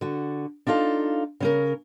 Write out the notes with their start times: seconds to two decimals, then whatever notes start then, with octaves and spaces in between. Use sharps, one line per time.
0.01 D3 F#4
0.67 D4 D#4 F4 A4 F5
1.40 C#3 C#4 A#4